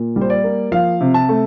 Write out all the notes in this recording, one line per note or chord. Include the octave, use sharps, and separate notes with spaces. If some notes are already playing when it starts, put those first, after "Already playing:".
Already playing: A#2
G3
C5
D5
A#3
F3 F5
C3
A5
A3